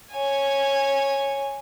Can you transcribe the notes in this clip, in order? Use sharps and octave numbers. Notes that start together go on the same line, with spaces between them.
C#5 G#5